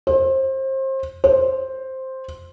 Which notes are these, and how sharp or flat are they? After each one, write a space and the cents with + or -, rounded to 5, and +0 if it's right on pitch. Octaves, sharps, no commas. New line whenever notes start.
C5 +30
C5 +5